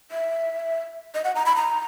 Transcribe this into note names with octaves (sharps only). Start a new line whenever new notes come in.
E5
D#5
F#5
A#5
B5
A#5